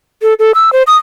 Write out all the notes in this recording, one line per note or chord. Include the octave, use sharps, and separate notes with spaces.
A4
A4
E6
C5
D#6